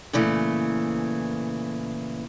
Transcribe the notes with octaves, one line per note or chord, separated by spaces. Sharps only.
A#2 C#3 E3 A3